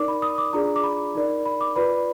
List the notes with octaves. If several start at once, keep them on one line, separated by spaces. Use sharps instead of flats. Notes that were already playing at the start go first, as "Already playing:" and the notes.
Already playing: D#4 A#4 D5 D6
B5
D#6
D6
D4 F4 G#4 D5 A#5
D6
B5
D#4 A#4 D5
B5
D6
F4 B4 D5 B5